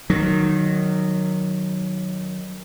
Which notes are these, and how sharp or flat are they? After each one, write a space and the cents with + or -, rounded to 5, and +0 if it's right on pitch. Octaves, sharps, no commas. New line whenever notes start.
D#3 -15 F#3 +0